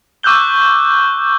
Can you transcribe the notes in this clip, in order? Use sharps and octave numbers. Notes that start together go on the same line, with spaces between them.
C#6 D6 E6 F#6 G6 G7